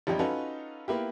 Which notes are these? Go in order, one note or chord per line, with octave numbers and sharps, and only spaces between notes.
A1 F2 G3 D#4 G4
C#4 D#4 F4 F#4 A4 B4
A#3 B3 E4 F4 G4